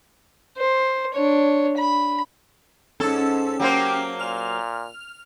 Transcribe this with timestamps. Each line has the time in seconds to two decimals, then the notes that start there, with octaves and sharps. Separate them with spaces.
0.57 C5
1.14 D4 C#5
1.77 B5
3.00 G#2 C#4 A4 A5 E6
3.60 F#3 A#3 G4 C5
4.19 A#2 F6 F7